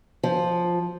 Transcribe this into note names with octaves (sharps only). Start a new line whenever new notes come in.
F3